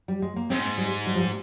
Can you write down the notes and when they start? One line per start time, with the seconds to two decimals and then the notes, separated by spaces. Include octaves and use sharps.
0.08 G3
0.22 G#3
0.36 A#3
0.50 G#2 C4
0.78 G3
1.06 G3
1.15 F3
1.23 G3